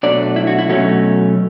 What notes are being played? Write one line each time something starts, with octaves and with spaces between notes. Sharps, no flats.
B2 F#3 A3 D4 D5
E4
F#4
E4
B2 F#3 A3 C#4 F#4